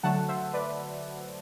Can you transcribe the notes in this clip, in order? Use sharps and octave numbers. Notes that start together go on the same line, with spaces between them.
D3 F#3 A3 F#5 A5
C5 E5
B4 D5